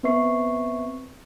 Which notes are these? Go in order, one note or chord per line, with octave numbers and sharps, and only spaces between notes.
B3 C4 B4 E5 C#6 C7